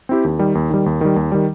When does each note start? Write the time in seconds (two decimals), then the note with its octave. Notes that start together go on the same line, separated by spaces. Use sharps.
0.09 C4 E4 G4
0.25 D#2
0.39 D#3 G3
0.55 D#2
0.70 D#3 G3
0.86 D#2
1.01 D#3 G3
1.16 D#2
1.32 D#3 G3